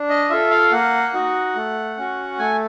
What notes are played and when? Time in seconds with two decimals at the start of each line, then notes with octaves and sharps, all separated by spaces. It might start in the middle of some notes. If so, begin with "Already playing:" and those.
Already playing: D4
0.09 D#5
0.30 F4 A4 E5
0.51 F5
0.72 A#3 F#5
1.14 D#4 F#4
1.56 A3
1.98 C#4 F#4
2.39 A3 G#5